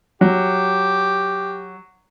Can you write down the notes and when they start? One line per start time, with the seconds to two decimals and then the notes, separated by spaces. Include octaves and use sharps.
0.21 F#3 G4